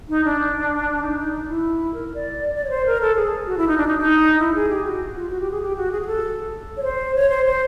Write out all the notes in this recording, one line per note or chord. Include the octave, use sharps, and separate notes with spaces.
D#4
D4
D#4
D#4
D#4
E4
A#4
D5
D5
C#5
C5
A#4
A4
G#4
F#4
E4
D#4
D4
D#4
D#4
E4
G#4
G4
F#4
F4
F#4
G4
G#4
G4
F#4
G#4
G#4
A4
C#5
C5
C#5
C5
C5